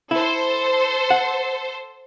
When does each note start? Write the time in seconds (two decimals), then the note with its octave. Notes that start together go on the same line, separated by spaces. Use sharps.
0.11 E4 A4 C5
1.10 F#5